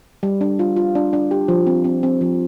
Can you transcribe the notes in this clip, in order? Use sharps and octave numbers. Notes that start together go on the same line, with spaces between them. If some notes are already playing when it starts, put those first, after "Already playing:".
G3
D4
F4
F4
D4
D4
G4
F3
C4
C4
C4
F3